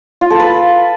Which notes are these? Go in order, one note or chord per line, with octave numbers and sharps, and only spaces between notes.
F4
A4
B4